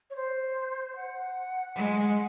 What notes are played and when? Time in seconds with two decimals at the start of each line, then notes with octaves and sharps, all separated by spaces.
0.10 C#5
0.16 C5
0.96 F#5
1.75 G#3 F#5